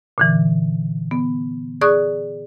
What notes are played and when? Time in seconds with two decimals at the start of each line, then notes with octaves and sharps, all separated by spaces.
0.18 A#2 D3 E3
1.11 B3
1.81 G#4 D5 C#6 D#6 F#6